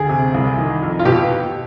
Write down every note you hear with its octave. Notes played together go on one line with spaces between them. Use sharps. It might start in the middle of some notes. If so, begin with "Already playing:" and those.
Already playing: D2 G#4
C3
C2
D#3
F2
F4
B2 G4